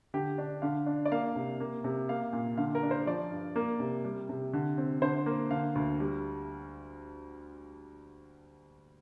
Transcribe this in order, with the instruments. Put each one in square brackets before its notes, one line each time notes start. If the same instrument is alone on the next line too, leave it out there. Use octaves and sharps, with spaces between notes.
[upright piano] D3 G4
D4
D3 F5
D4
D5
A#3 F5
C3
A#3
C3
A#3 F5
A#2
D3 F5
A#4
D4
C5
F3 D5
G2
A#3
C3
G3
C3
D3
C4
D3 C5
A#3
D3 F5
D2
G3